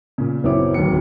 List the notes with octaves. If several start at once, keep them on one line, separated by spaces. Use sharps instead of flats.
A#2 C#3
F#1 B3 C4 E4 C#5 D6
D1 D#2 F#3 F#5 C#7